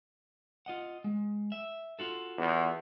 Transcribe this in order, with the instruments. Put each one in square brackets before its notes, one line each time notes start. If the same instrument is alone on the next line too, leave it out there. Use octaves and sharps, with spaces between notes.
[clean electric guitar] F4 D#5 F#5
G#3
E5
F4 F#4 A4
[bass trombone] E2